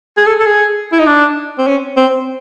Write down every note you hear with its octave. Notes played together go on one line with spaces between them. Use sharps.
G#4
A4
A4
G#4
E4
D#4
D4
C4
C#4
C4